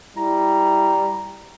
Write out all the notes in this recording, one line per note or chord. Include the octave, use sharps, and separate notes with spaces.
G3 E4 A#5